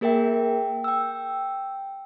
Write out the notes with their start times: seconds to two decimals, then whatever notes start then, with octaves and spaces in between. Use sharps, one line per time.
0.01 A#3 G#4 A#4 E5 G5
0.84 G5 E6